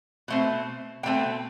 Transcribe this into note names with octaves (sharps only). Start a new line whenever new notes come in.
B2 A3 C4
B2 A3 C4 G5